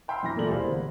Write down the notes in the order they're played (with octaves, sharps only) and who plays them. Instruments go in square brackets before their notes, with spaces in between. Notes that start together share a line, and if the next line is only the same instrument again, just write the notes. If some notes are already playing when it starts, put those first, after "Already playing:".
[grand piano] F#5 G5 B5 C6 E6 F6
F#2 E3 A#5 B5 A#6
A#2 A3 G#4 A#4 D5 F#7
E1 G3 E4 C5 F5 B5
G1 F#5